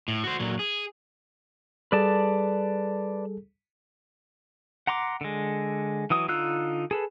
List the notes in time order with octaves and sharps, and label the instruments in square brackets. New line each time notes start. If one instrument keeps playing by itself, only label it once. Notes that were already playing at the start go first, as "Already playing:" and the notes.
[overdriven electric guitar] A2
F#4 C5
A#2 F#3
G#4
[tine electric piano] G3 G#4 A4 [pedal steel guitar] B4 D5 A5
[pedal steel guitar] F#5 A#5 C6 D6
D3 G#3
E3 F#3 D#6
D3 D#4 F4 E6 F#6
G#4 A4 B4